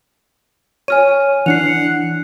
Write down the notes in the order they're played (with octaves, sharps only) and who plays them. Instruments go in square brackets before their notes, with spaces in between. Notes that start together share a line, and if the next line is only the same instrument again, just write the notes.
[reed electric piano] C#5 [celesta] G#5 F6 D#7
[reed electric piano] E3 D4 [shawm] F#5 [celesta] C7 C#7 F7